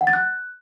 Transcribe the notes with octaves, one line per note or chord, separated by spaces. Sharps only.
F#5
A6
F#6